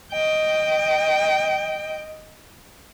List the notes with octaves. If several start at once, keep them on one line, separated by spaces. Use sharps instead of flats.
D#5 G5